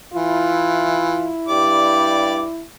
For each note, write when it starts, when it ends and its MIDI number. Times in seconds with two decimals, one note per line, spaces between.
0.14 1.28 52
0.14 2.64 64
0.14 1.32 65
1.48 2.44 43
1.48 2.46 67
1.48 2.46 74
1.48 2.46 86